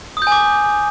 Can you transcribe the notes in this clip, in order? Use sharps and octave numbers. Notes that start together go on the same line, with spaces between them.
D#6
G6
G#5
D6